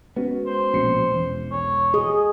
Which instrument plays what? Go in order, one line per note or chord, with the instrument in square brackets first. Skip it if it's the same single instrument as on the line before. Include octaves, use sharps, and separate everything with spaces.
[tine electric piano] G#3 C#4 F#4 [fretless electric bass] B3
[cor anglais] C5
[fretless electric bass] A#1 B2 [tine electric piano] C#4 C7 C#7
[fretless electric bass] E1 [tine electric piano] E3 G#3
[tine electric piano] B1 [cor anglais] C#5
[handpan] G#4 [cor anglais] D#5